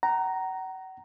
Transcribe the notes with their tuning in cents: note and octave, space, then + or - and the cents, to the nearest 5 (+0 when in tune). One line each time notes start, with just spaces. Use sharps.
F#5 +40 A#5 +0